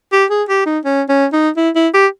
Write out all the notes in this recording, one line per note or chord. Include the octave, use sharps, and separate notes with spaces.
G4
G#4
G4
D#4
C#4
C#4
D#4
E4
E4
G4